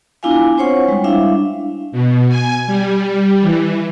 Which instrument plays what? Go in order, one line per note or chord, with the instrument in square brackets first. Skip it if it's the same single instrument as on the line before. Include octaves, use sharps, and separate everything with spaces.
[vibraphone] B3 D4 E4 F4 F5 G#5
C4 F4 C5 C#5 F#5 C#6
G3 G#3
D4 E4 E5 F5
[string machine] B2
G#5
G3
E3